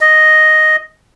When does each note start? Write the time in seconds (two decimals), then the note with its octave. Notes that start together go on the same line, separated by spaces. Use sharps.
0.01 D#5